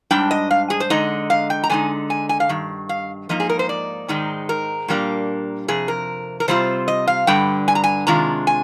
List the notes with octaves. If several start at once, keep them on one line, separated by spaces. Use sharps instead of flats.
G#2 G3 D4 G5
D#5
F5
G#4
C5
D3 G#3 D#4 D#5
F5
G5
A#5
D3 G#3 D#4 G#5
G#5
G#5
F5
G2 D#3
F5
G#2 F3 A#3 D#4 D#5
G#4
A#4
C5
D5
G#2 D#3 G#3 D#4
A#4
A#2 G3 A#3 D4
F2 C3 G#4
A#4
A#4
C3 G3 C4 F4 C5
D#5
F5
G2 D3 G3 G5
G#5
A#5
G#5
C3 D#3 G#3 D4 F4 A#5
G#5